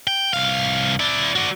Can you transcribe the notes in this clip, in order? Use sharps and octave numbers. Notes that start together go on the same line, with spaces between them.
G5
C2 F5
E4 D5
F#4 D5